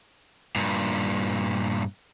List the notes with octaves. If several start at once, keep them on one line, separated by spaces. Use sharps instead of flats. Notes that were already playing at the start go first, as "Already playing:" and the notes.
G2 A#2